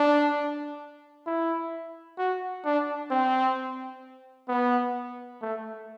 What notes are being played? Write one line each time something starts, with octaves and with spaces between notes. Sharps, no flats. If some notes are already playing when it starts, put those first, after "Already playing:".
Already playing: D4
E4
F#4
D4
C4
B3
A3